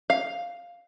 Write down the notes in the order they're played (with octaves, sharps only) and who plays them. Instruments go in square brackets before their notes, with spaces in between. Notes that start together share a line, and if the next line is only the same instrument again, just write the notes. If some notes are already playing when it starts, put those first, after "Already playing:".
[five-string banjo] F5